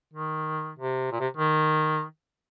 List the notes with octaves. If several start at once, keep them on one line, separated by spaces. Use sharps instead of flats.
D#3
C3
A#2
C3
D#3